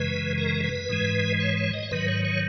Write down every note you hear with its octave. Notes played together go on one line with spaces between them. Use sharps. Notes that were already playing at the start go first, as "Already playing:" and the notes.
Already playing: F#2 C#3 E3 G#3 B4
A#4
B4
G#2 E3 G#3
C#5
C#5
D#5
C#5
G#2 D#3 F#3 B4
C#5
C#5